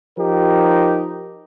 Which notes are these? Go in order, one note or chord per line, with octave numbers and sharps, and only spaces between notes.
F3 D#4 G4 A#4